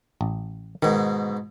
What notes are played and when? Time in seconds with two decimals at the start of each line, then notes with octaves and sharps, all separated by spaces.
0.21 A1
0.82 G#2 B2 D#3